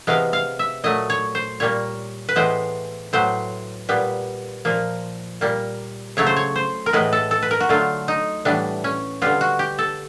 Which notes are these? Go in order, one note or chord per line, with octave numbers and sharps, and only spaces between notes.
C3 E3 G#3 B3 F5
F5
E5
A#2 F#3 A3 D#5
C#5
C5
A#2 G3 A#3 C#5
B4
A2 E3 G#3 B3 C5
A2 F#3 B3 C5
A#2 G3 B3
A#2 F3 A#3
A#2 G3 A#3
C#3 F#3 A3 C#5
C5
C#5
C5
A#4
A2 E3 G#3 B3 B4
A4
A4
B4
A#4
F#4
D3 F#3 A3 F4
D#4
A2 E3 G3 B3 D4
C#4
D3 G3 B3 F4
F#4
G4
A4